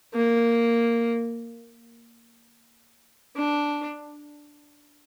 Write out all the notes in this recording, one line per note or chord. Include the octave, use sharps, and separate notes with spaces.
A#3
D4